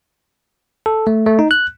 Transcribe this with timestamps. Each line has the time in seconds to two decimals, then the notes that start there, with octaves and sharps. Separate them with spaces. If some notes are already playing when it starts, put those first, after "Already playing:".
0.86 A4
1.07 A3
1.26 A3
1.39 D#4
1.51 F#6